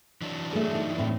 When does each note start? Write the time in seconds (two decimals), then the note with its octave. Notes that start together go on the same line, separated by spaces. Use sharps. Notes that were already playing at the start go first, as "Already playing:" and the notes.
0.22 E3 F#3 D4
0.53 A3 G#4
0.75 D#4 D5
0.98 A2 C4